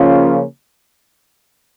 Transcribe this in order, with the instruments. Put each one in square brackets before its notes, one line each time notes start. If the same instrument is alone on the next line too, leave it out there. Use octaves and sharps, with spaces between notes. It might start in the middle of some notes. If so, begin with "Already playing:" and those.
Already playing: [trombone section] C#3 F3 A#3 C#4 F4